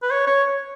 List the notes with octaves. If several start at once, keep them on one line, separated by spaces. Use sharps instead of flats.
B4
C#5
C#5